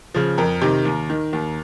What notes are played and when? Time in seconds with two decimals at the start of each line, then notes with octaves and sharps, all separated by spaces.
0.14 C#3 F3
0.38 F2 A#4
0.61 C3 D#3
0.85 D#2
1.10 D#3
1.33 D#2